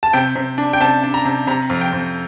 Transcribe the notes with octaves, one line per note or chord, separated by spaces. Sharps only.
A5
C3 G5
C3
D4
G5
C3 A5
D4
A#5
C3
C3 A#5
F2
G5
F2